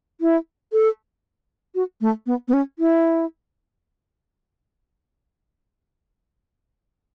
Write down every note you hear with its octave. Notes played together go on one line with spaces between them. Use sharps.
E4
A4
F#4
A3
B3
B3
C#4
E4